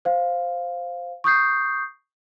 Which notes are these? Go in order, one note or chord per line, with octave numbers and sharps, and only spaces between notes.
C5 F5
C#6 D#6 G6 C7